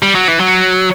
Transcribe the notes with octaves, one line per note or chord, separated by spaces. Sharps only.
G3
F#3
E3
F#3